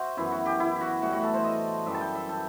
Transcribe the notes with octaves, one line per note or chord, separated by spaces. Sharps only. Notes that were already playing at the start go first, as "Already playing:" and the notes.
Already playing: F#4 C5 E5
F#2 E3 B3 E4
F#4
G4
E4
F#4
A2 E3 G3 F#4
F#4
A4
C5
D#5
F#2 E3 G3 E5
A5
G5
E5
A4